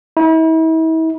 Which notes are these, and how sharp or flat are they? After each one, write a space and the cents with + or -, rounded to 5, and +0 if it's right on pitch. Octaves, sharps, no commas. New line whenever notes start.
E4 -40